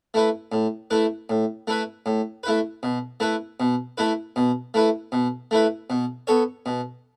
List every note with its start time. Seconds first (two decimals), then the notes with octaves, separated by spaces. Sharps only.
0.14 A3 E4 B4
0.52 A2
0.91 A3 E4 B4
1.30 A2
1.67 A3 E4 B4
2.06 A2
2.43 A3 E4 B4
2.83 B2
3.20 A3 E4 B4
3.60 B2
3.98 A3 E4 B4
4.36 B2
4.74 A3 E4 B4
5.12 B2
5.51 A3 E4 B4
5.90 B2
6.27 B3 A4 C#5
6.66 B2